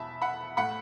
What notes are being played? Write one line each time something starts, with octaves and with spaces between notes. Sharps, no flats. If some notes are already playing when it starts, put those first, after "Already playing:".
Already playing: E2 B2 E5 A5 B5
F#5 B5
A2 A3 F#5 B5